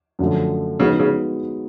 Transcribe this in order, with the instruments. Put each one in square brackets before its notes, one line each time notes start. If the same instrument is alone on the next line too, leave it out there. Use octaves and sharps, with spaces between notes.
[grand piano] F#2 D3 F3 A3
[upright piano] C#3 [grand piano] F3 G#3 B3 D#4 F#4
[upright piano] C#3